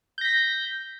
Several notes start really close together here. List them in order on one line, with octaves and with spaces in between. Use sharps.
G6 A#6 B6